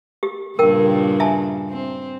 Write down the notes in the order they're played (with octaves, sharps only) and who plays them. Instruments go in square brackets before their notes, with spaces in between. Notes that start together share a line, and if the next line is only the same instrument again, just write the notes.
[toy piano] G4
[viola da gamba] G2 A#2 C#3 [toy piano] A#4 G5
[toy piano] E5 G#5 A5
[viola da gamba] C4